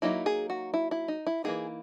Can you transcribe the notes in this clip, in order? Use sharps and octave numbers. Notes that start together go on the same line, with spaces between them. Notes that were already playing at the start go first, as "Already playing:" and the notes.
F#3 A#3 D#4 E4
G#4
F#4
E4
E4
D#4
E4
E3 A#3 D#4 G#4